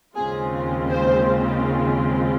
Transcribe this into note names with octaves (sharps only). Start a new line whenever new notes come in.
D#2 C#3 G#3 C4 F4 G#4
C5